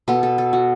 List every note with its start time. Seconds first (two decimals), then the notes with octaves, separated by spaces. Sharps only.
0.08 B2 B3 A4
0.23 A4
0.38 A4
0.53 F#4